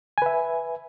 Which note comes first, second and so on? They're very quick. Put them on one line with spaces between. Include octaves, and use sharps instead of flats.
G#5 B4 E5